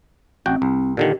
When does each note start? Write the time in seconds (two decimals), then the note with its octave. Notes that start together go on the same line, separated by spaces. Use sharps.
0.46 A1 C4 F#4 G5
0.62 C2
0.97 A#2 D3 D#3 G4